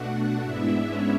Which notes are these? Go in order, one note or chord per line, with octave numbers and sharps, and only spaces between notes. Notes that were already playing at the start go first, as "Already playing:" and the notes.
Already playing: B2 A3 D4 F#4 F#5
G#2 G#3 B3 D4 E4 E5
C#4 C#5